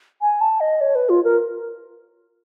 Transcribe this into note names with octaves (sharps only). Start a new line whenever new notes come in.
G#5
A5
D#5
C#5
B4
F4
A#4